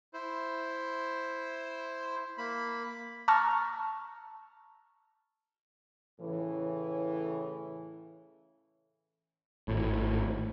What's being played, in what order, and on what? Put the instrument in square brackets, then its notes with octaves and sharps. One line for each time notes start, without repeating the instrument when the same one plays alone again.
[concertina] E4 C5
A#3 B5
[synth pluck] A5 A#5 C#6 E6 F6
[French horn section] A2 C#3 E3
[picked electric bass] G#1 A2